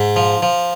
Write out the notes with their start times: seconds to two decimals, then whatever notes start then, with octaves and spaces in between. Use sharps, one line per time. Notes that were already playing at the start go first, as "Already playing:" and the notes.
Already playing: G#2
0.16 F3
0.42 F3